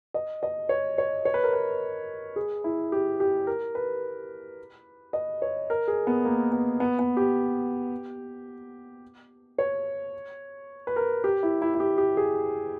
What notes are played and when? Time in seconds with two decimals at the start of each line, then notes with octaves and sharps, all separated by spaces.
0.14 D#5
0.43 D#5
0.69 C#5
0.98 C#5
1.25 C#5
1.34 B4
1.44 A#4
1.53 B4
2.36 G#4
2.64 E4
2.92 G4
3.20 G4
3.47 A#4
3.75 B4
5.13 D#5
5.42 C#5
5.70 A#4
5.88 G#4
6.07 B3
6.25 A#3
6.52 B3
6.80 B3
6.99 B3
7.17 G4
9.58 C#5
10.87 B4
10.96 A#4
11.24 G4
11.43 E4
11.62 E4
11.74 E4
11.80 G4
11.98 G4
12.17 G#4